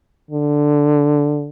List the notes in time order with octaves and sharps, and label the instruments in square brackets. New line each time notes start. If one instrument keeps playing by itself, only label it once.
[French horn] D3